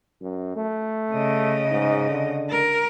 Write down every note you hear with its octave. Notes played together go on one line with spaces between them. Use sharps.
F#2
A3
C#3 D#5
G#2
D3
A#4